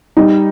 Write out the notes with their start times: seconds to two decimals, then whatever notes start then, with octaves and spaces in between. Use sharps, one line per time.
0.17 G3 D#4